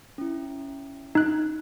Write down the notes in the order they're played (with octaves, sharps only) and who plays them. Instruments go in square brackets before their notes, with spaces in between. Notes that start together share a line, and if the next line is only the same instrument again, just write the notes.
[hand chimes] C#4 E4
[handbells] D#4 F#6